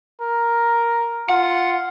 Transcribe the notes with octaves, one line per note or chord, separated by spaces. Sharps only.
A#4
F4 F#5